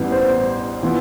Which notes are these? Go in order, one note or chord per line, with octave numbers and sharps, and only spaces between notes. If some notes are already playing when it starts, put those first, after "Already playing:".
Already playing: A1 G2 E3 B3
C5
E3 B3 F4